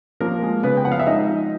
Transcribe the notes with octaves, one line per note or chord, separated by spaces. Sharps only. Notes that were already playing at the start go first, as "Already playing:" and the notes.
F3 A#3 A#4
G#3
C#3 B3 B4
G5
F3 F#5
F5
E5
G#3 D#4 D#5
F3